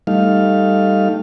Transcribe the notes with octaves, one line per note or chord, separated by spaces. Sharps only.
G3 A3 D#4 F5